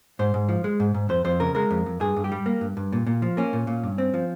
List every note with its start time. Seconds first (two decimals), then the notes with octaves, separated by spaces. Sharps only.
0.19 G#2 C5
0.34 G#2
0.49 F3
0.64 G#3
0.80 G#2
0.94 G#2
1.09 F2 C5
1.25 F2 C5
1.40 C#3 A#4
1.55 G#3 A#4
1.71 F2
1.86 F2
2.00 G2 G#4
2.17 G2
2.24 G4
2.32 G3
2.46 A#3
2.61 G2
2.77 G2
2.93 A#2
3.07 A#2
3.22 F3
3.37 A#3 C#4
3.53 A#2
3.67 A#2
3.84 G2
3.98 C4
4.14 F3